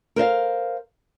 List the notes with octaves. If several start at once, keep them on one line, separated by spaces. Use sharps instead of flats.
A#4 C5 D#5 F5